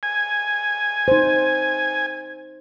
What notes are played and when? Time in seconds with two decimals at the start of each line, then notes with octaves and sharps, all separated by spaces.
0.03 G#5
1.08 D#4 C5